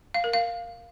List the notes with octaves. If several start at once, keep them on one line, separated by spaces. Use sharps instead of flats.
F5
A#4
F5